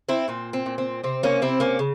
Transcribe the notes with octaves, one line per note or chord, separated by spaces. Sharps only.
C4 E4
A#2 C4
C4
A#2
C4
C3 C4
A#3 C#4
C3 C4 E4
A#3 C#4
C#3